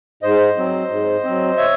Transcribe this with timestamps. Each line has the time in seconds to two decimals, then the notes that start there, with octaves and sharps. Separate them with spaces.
0.23 G#2 C5 D#5
0.57 F#3 C4
0.90 G#2
1.24 F#3 C4
1.57 C#5 E5